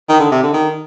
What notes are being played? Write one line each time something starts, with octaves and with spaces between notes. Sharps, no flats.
D#3
D3
C3
D3
D#3